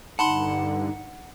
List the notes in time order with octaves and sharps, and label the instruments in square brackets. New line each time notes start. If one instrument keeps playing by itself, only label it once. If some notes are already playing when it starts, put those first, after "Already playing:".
[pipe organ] G2 D3 [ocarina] D#4 [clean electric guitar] F#5 [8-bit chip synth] A5 B5 C6